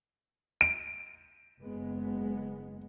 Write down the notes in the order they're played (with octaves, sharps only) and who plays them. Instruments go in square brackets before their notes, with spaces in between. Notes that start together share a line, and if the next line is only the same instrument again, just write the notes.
[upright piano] D7
[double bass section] F#1 G#3 B3